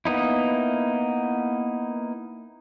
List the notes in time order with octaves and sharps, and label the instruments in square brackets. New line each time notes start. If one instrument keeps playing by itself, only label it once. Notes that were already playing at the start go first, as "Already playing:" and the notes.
[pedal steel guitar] A#3 B3 D#4 E4